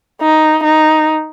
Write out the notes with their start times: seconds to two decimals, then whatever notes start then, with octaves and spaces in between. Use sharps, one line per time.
0.21 D#4
0.64 D#4